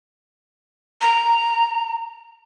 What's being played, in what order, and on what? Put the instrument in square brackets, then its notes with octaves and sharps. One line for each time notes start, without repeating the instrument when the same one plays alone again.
[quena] A#5